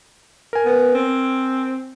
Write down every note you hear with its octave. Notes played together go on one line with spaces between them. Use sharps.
A#4 G#5
B3
C4